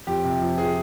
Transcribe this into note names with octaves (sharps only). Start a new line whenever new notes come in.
F2 G4
C3
F3
G#4